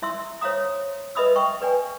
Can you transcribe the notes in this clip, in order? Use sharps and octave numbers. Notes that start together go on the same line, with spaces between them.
E4 E5 C6 E6
C5 C#5 E5 F5 A#5 D#6
B4 D#5 E5 B5 D#6 E6
E5 G5 C#6
B4 D5 G5 G#5